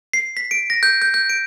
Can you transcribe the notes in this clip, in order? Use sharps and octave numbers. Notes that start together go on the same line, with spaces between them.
C7
B6
D7
A#6
G6
G6
G6
D7